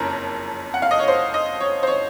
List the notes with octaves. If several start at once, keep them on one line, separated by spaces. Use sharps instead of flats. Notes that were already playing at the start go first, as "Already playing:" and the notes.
Already playing: F#1 F2 C#3 A#4
F#5
F5
D#5
C#5
C5
D#5
C#5
C5
C#5